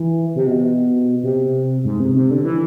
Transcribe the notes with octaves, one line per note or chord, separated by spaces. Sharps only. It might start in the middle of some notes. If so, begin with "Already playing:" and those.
Already playing: E3
C3
B2
C3
G#2
C3
C3
D3
E3